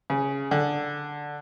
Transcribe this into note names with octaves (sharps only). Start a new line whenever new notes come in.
C#3
D3